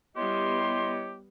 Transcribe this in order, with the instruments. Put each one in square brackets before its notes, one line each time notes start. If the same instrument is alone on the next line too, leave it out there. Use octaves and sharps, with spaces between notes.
[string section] G3 B3 [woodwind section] E4 C#5 D#5 [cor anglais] G4 [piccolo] C6